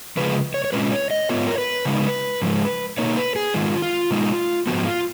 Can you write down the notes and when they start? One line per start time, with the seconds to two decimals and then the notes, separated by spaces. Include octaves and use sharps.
0.17 C#3 F3 G#3 B4
0.54 C#5
0.64 C#5
0.73 A#2 G#3 C#4 F4 B4
0.92 C#5
1.11 D#5
1.29 G#2 F3 B3 F4 C#5
1.47 A#4
1.58 B4
1.85 C#3 G#3 D#4
2.42 G#2 F3 G#3
2.98 B2 A#3 D#4 C#5
3.17 B4
3.36 G#4
3.54 G#2 D#3 G#3 F4
3.82 F4
4.11 B2 G#3 D#4
4.67 G#2 F3 B3 F#4
4.85 F4